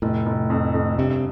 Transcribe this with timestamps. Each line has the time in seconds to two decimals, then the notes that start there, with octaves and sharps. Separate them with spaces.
0.02 F1 A2
0.26 F1
0.50 F2
0.74 F2
0.98 G2 C3